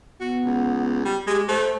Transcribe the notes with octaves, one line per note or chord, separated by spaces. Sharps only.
B3 F#4
C#2
G3
G#3 G4
A3 C5